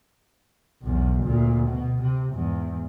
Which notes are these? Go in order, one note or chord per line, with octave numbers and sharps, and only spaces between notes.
B1 E2
D2 A#2
B2
C3
E2 G#2